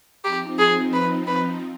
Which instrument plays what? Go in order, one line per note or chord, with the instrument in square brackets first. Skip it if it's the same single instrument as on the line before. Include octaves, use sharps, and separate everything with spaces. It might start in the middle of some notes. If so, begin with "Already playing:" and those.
[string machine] F3 C4 D#4 [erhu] G4
[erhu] G#4
B4
B4